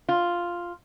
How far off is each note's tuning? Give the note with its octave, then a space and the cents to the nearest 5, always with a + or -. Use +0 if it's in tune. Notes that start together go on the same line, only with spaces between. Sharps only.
F4 +0